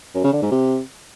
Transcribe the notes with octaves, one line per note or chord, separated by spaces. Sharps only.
F#2
C#3
D3
G#2
C3